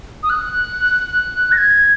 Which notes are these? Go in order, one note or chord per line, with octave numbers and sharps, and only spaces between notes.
D#6
F#6
A#6
G#6